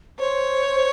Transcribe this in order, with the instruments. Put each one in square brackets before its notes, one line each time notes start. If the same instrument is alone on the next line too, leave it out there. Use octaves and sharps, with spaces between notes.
[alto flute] C5 [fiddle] C#5